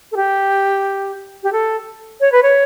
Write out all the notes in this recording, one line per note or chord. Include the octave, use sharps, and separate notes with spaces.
A4
G4
G4
A4
C#5
B4
C#5